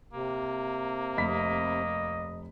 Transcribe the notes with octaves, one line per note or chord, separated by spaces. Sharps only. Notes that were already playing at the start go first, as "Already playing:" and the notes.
C3 A#3
F1 D#5 B5 B6